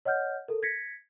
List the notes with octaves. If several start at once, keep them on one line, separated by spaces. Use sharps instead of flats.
C#5 D#5 F#5 F6 G6
A4 A#4
G#6 A#6 B6 C#7